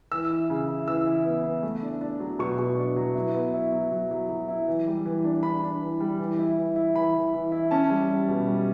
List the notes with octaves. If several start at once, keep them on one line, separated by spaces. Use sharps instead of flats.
E3 E6
E4
C#3
E4
E3 E6
E4
B3
B3
A3
D4
D4
F#3
B2 C#6
B2
D4
F#3
E4
B3
E4
F#3
F#3
F#3
F#3
E4
E3
G3
E3
D4
D4 B5
D4
E3
G3
E3
E4
E3
E4
E3 B5
E3
E3
E4
C#4 A5
G3
G3
B2
G3